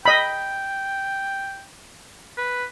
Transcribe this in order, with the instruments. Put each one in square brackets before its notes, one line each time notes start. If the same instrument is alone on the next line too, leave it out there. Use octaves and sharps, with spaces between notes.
[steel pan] D#5 B5 [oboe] G5
[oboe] B4